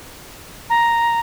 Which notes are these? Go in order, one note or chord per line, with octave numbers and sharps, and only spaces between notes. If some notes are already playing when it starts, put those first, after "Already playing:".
A#5